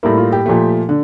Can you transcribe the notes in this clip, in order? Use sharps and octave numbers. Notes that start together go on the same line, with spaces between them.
A2 G3 A#3 E4
F4
G4
A#2 F3 A3
D3